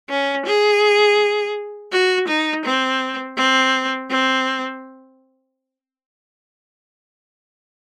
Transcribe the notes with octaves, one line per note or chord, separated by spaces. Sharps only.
C#4
G#4
F#4
D#4
C4
C4
C4